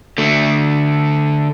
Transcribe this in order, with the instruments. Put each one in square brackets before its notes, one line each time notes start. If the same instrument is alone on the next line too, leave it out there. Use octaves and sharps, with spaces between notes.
[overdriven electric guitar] D3 A3